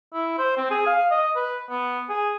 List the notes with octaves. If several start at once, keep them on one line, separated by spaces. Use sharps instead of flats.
E4
C5
C4
G#4
F5
D#5
B4
B3
G#4